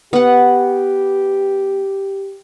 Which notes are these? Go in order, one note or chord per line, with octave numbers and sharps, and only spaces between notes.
B3 G4 F#5